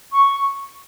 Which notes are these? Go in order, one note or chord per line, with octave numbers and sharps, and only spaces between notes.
C#6